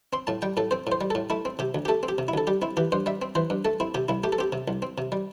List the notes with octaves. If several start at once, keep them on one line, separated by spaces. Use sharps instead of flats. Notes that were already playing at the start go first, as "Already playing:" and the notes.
C4 C6
A2 A5
G3 G5
A2 A4
C4 C5
A2 C5
G3
A2 A4
A3 E4
C4
C3 G4
D2
G4
A3 A4
C4
G4
C3
E4
D2 A4
G3 G4
C4 E4
E3 G4
G2 C5
G3 E5
C4
E3 C5
G2
A3 A4
C4 E4
C3 G4
C2 E4
A3 G4
A4
C4 G4
C3
C2
C4
C3
G3